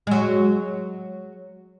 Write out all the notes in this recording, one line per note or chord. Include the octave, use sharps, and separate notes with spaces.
F#3 G#3